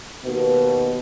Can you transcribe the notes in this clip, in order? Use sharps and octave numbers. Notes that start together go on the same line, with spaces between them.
D#2 B2